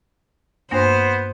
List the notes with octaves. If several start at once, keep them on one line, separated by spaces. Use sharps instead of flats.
G2 A#3 B3 D4 C5